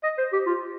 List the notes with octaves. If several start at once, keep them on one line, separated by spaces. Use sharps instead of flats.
D#5
C5
G4
F4